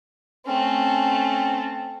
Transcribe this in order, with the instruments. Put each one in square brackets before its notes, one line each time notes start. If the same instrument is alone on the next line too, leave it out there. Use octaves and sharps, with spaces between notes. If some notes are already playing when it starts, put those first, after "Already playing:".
[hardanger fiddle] A3 C4 [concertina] C#4